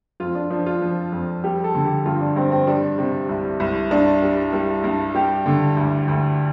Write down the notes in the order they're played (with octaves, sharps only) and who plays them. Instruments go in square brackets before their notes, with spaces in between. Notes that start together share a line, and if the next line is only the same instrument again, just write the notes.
[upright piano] F2 F4
D4
F3 D4
F4
F3
F2
G3 G4
A4
D3
G4
G2 F4
D4
G2 C4
C4
G3 D4
C3
C2
C2
G2 D4
G3
G3
G2
G3 G4
D3
D2
D2